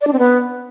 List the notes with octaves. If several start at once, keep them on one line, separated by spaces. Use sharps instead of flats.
D5
D4
C4
B3